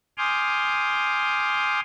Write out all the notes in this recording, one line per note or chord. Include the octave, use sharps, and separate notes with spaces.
G#5 C6 D6 D#6 F6 G6